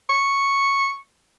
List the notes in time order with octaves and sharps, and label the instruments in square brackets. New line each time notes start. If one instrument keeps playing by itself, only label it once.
[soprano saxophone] C#6